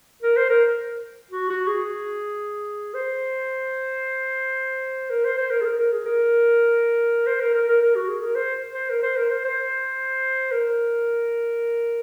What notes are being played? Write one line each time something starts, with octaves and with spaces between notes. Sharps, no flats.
A#4
C5
A#4
F#4
F#4
G#4
C5
A#4
C5
C5
A#4
G#4
A#4
A#4
G#4
A#4
C5
A#4
A#4
A#4
A#4
F#4
G#4
A#4
C5
C5
A#4
C5
A#4
C5
C5
A#4